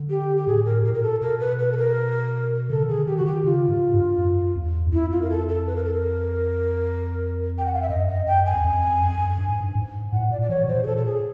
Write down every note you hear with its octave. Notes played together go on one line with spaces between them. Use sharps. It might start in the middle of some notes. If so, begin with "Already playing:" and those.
Already playing: D3
G4
G4
A2 G#4
A#4
A#2 A#4
A#4
A4
B2 A#4
B4
B4
A4
A#4
C#3 A4
D#3
D3 G#4
D#3 G4
F#4
D3
D#3 G4
C#3 F4
G#2
G2
F#2
E2
F#2
F2 E4
F4
A#4
A4
A4
B4
A#4
A4
A#4
G5
F#5
F5
E5
F#2 D#5
D#5
F#2 G5
G#5
E2
F2
F#2
F2
F#2
G2
G#2
G2
G#2
A2 F#5
A#2 D5
D5
E3 C#5
B2
A#2 C5
G#4
A#2 A4
A4
G#4